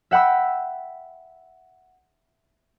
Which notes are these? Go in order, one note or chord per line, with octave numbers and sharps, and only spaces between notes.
E5 F#5 G5 B5 E6